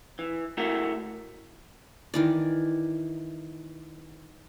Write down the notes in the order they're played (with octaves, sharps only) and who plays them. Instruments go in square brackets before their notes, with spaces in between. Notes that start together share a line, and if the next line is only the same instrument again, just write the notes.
[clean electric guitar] E3
A3 E4 F#4 A#4
[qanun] D#3 E3 D5